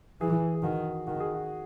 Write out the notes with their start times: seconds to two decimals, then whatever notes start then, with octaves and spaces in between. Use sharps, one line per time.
0.21 E3 G#4
0.54 G#4
0.63 D#3 F#4
1.07 D#3 F#4
1.20 G#4
1.34 F#4